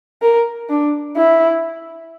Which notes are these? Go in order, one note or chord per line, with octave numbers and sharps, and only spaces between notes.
A#4
D4
E4